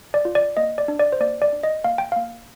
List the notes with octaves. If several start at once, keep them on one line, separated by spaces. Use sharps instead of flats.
D5
F4
D5
A#3 D#5
D5
D4
D5
C5
A#3 D5
D5
D4
D#5
A#3 F5
G5
A#3 F5